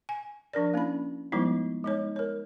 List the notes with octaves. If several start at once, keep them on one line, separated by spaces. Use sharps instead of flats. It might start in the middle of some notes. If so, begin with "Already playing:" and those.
G#5
F3 D4 A#4 D5
A#3 C#4 E4 B5
F3 G3 G#3 B3 D#4 E4
G#3 D#4 C#5
A#4 C#5